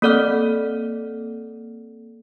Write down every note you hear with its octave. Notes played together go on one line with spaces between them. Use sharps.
A#3 C4 A4 D5 F#5 F6